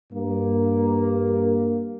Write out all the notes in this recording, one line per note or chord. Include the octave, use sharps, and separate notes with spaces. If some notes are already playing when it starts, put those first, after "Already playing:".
G2 A#3